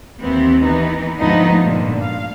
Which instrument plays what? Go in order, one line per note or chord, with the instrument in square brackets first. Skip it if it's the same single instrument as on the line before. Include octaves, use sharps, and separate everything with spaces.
[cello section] D#2 E3 B3 C4
E3 B3 D#4
D2 G#2 F3 A3 B3 D#4
G2 A#2 D3
F5